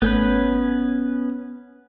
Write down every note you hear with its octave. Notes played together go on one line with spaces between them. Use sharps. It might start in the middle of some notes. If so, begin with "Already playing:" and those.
G#1 A3 B3 C#4 B4 G6